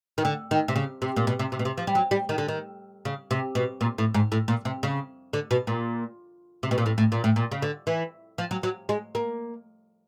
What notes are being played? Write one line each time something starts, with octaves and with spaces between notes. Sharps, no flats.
D#3
D3
D#3
C3
C#3
C3
A#2
B2
C3
C3
B2
C3
F3
G3
F#3
G3
D#3
D3
D#3
C#3
C3
B2
A#2
A2
G#2
A2
A#2
C3
C#3
D3
B2
A#2
C3
B2
A#2
A2
A2
A#2
A2
A#2
C#3
D3
E3
F3
F#3
F#3
G#3
A#3